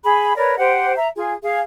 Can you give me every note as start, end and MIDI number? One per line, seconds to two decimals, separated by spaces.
0.04 0.36 68
0.04 0.36 83
0.37 0.57 70
0.37 0.57 71
0.37 0.57 73
0.37 0.57 74
0.58 0.95 67
0.58 0.95 72
0.58 0.95 78
0.58 0.95 79
0.96 1.09 76
0.96 1.09 82
1.16 1.33 65
1.16 1.33 68
1.43 1.60 68
1.43 1.60 77